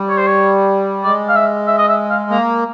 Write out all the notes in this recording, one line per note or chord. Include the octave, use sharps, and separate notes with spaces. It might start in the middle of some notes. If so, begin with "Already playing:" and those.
Already playing: G3
C#5
C5
C#5
G#3 D5
F5
E5
E5
D#5
E5
F5
A#3 A#5